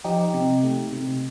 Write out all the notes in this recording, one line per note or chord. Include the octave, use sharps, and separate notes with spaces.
F3 D#4 G4
C3
A3
C3